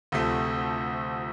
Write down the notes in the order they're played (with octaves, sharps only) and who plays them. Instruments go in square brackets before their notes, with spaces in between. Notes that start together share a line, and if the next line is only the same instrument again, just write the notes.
[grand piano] D2 C3 F3 A3